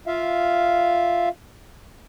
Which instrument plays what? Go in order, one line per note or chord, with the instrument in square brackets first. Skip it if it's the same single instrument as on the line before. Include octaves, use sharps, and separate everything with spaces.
[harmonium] F4 E5 F5